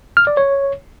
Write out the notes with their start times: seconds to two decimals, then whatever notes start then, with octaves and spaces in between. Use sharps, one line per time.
0.17 F6
0.27 D5
0.37 C#5